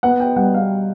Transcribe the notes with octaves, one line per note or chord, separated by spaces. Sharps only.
B3 F#5
G5
G3 F#5
F5